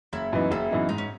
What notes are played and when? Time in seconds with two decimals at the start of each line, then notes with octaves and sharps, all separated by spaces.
0.13 F#1 E4
0.33 F#2 E3 B3 D#4
0.51 F#1 E4
0.71 F#2 E3 B3 D#4
0.89 G#2 D#4
0.98 C#4